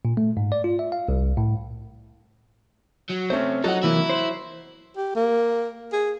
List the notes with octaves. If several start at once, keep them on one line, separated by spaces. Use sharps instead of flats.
A#2
A3
G#2
D5
F4
E5
F5
C2
A2
F#3
C3 A3 C#4 C5
F#3 D#4 A4 F#5
C3 E3 A#3 E4
C5
G4
A#3
G#4